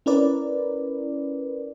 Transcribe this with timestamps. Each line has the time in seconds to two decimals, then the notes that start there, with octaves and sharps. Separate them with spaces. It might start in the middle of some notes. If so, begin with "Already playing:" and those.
0.06 C#4 E4 A#4 B4 D5